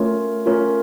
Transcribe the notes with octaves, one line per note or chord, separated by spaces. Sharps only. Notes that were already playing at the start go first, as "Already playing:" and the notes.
Already playing: A3 C#4 F4 A#4 C#5
A3 C#4 F4 A#4 C#5